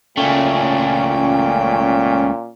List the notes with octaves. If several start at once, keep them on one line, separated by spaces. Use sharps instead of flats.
C#2 A#2 A3 C#4 G5